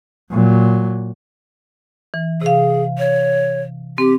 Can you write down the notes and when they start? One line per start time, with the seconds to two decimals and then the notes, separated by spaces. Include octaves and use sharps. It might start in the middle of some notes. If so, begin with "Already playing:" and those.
0.31 A#2 F#3
2.14 E3
2.42 C3 G#4 F5
2.98 C#5
3.98 C4 G4